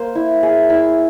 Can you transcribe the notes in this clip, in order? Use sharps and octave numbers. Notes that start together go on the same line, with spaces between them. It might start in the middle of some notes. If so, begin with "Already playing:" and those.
Already playing: A#3 C5
E4
G#4 E5
E4